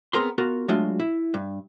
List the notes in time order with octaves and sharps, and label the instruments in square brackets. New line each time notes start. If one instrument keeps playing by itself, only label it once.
[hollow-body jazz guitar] B3 C4 G#4 A#4 A#5 C6
B3 F4 F#4 A#4
F#3 G#3 A3 D4 F4 F#4
E4
G2